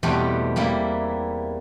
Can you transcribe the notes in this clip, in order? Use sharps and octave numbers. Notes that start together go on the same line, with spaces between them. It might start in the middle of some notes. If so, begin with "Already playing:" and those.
E2 B2 G3 A3 C4 G4
G3 A#3 E4